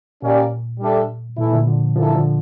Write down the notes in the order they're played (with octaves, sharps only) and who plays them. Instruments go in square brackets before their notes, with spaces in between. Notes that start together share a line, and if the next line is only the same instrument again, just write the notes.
[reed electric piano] A#2 [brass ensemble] A#3 C#4 G4 D5
[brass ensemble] G3 D4 A4 E5
[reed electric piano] A#2 [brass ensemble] E3 A3 E4
[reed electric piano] A#2 D3
D3 F3
[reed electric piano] D3 F3 [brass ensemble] E3 A#3 E4 A4
[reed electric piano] D3 F3